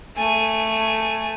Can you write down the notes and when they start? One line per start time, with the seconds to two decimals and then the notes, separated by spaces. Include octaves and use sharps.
0.17 A3 G#5